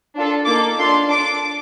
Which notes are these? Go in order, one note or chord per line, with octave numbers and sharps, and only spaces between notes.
D4 F4 A4
A#3 D#4 A4 D6
D4 F4 A4 C6
D4 A4 D6